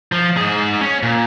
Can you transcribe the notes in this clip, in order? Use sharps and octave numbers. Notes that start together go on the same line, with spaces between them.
F3
G#2 G#4
C#4
A#2